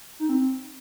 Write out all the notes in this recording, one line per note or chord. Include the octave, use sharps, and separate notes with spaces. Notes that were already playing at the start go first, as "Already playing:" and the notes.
D#4
C4